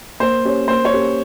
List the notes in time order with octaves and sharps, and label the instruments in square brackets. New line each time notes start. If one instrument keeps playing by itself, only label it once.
[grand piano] A#3 [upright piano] C5
[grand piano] C#4 G4 C#5
[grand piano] A#3 [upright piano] C5
[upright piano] C#5
[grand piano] C#4 G4 A#4